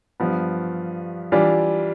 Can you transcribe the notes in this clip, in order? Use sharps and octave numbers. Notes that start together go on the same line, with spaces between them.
G2 F3 B3
E3 G3 D4 F4